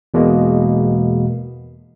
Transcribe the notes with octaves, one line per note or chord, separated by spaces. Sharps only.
E2 B2 G#3 A#3